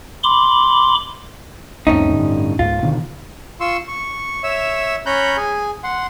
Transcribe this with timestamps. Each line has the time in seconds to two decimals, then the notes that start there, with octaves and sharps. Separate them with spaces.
0.24 B5 C6 D6
1.87 C2 F2 A2 C#4 D#4
2.11 G2 D3
2.59 C#2 G#2 F4
2.82 B2 D3 D#3
3.60 F4 C6 C#6 E6
3.88 C#6
4.44 C#5 E5 E6
5.06 C#4 C#5 A#5 B5 F#6 G6
5.37 G#4 G#5
5.84 F#5 C6